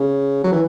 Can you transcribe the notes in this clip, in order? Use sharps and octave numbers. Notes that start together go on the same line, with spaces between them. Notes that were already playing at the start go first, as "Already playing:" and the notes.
Already playing: C#3
F#3
E3